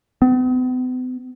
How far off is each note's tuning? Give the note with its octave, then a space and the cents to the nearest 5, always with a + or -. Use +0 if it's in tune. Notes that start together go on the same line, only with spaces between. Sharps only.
B3 +45